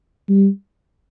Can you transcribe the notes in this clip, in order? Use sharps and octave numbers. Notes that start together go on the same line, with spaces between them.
G3